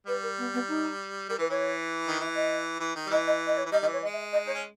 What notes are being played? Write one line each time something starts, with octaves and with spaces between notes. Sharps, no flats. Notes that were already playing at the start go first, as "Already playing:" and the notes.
G3 B4
A#4
B3
B3
D#4
G3 A#4
E3 B4
E3 C#5
D#3
E3 E5
D#5
E3
D#3
G3
E3 D#5
D#5
D#5
C#5
E3
G3 D#5
D#3 D#5
E3
C#5
G#3 D#5
E5
D#5
D#4 C#5
C#4